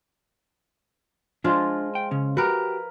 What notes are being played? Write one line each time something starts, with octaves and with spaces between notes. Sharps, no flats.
F3 G#3 D4 F4 G#4
G5
C#3 C#4
F#4 G4 A#4 B4